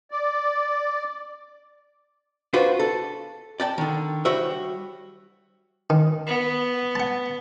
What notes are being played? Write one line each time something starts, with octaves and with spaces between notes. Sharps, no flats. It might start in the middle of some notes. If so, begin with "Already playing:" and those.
D5
D4 F4 F#4 B4 C5
A4
D5 G5 A5
D3 D#3
G3 F#4 C5 C#5 E5
D#3
B3
F#5 A5